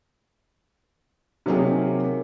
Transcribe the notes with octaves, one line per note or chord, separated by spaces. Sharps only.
C3 D#3 F#3 A#3 D#4 G#4